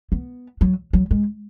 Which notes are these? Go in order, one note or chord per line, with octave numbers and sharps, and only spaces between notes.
B3
F#3
F#3
G#3